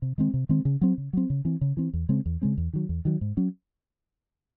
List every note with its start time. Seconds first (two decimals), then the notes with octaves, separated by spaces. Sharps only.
0.02 C3
0.18 D#3 G#3 C4
0.34 C3
0.49 D#3 G#3 C4
0.65 C#3
0.81 F#3 C4
0.98 C#3
1.13 F#3 C4
1.30 C#3
1.45 E3 C4
1.61 C#3
1.77 E3 C4
1.93 E2
2.09 C#3 G#3 C4
2.26 E2
2.42 C#3 G#3 C4
2.57 E2
2.73 D#3 F#3
2.89 E2
3.05 D#3 F#3
3.21 G#2
3.37 F#3 C#4